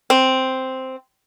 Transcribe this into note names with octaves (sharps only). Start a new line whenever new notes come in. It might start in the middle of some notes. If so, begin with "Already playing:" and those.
C4